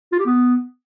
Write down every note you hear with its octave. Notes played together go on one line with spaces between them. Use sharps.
F4
G4
B3